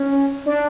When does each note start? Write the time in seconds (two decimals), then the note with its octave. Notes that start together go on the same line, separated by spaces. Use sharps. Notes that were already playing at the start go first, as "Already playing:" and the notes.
Already playing: C#4
0.46 D4